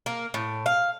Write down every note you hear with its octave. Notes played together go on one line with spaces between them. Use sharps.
A#3
A2
F5